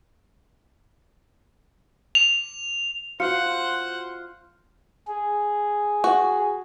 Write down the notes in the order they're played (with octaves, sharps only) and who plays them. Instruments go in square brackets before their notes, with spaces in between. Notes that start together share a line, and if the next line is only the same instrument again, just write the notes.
[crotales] F7
[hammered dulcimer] F4 [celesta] F#4 C#7 [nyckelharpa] C5 F#5
[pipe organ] G#4
[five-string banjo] F#4